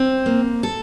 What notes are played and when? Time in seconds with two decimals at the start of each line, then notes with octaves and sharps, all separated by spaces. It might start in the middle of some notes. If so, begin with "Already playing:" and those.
Already playing: C4
0.26 A#3
0.63 A4